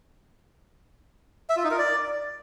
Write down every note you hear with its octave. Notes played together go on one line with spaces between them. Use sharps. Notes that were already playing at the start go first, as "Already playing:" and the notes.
E5
F4
D#4
A#4
D5